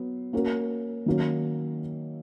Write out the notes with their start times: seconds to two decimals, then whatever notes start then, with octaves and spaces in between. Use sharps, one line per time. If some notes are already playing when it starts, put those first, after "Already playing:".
Already playing: F#3 B3
0.33 A#3 C#4 F#4 A#4
1.06 D#3 F#3 A#3 C#4